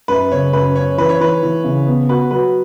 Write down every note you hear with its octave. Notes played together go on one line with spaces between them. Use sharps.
F#2 B4
C#3 C#5
F#2 B4
C#4 C#5
E3 B4
C#5
E3 B4
E3
C#3
B3
F#4 B4
F#3 B4